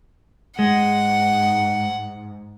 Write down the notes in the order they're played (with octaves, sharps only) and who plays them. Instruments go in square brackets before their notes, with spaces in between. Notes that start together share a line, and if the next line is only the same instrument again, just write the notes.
[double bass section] G#2 [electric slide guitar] G#3 [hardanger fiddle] F#5